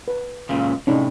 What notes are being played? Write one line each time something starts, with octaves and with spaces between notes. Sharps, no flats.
B4
C#2 A#2 C#3
A2 C3 C#4 D#4 D5